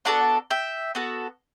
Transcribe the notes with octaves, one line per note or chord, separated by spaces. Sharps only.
B3 D4 F#4 A4 D5 F#5
E5 G5
B3 F#4 A4